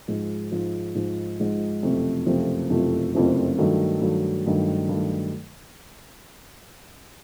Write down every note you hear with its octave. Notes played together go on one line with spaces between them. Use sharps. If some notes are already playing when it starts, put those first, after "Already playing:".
G#2 F3 G#3
G#2 F3 G#3
G#2 F3 G#3
G#2 F3 G#3
F#1 F2 C3 F3 A3
F#1 F2 C3 F3 A3
F#1 F2 C3 F3 A3
F#1 F2 C3 F3 A3
G2 D#3 F#3 A3
G2 D#3 F#3 A3
G2 D#3 F#3 A3
G2 D#3 F#3 A3